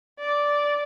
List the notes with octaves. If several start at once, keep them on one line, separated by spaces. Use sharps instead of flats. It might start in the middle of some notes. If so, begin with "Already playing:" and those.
D5